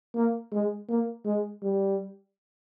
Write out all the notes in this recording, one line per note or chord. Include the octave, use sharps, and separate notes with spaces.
A#3
G#3
A#3
G#3
G3